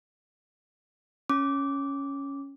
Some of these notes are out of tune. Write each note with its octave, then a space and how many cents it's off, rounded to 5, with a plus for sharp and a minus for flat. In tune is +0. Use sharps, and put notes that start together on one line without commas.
C#4 +0 D6 -10